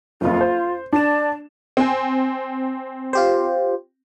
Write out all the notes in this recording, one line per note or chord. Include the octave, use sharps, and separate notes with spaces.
F#1 F2 F4
C5
D4 D5 E7
C4 G#5
F4 G4 C5